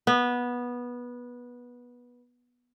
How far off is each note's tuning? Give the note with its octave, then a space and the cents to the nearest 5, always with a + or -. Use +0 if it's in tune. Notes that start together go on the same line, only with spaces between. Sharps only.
B3 -15